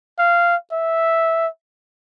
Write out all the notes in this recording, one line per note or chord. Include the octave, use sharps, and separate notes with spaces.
F5
E5